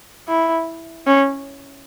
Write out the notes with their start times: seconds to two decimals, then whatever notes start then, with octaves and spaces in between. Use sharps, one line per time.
0.28 E4
1.07 C#4